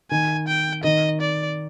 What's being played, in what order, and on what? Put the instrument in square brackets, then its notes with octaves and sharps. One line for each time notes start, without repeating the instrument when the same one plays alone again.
[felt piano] D#3 [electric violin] G#5
[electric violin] G5
[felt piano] D#3 [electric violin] D#5
[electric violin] D5